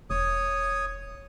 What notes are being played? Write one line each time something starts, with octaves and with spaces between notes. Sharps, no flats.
E1 C#5 D#6